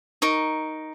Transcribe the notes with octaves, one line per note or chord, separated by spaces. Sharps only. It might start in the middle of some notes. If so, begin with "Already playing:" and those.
D#4 A#4 C#6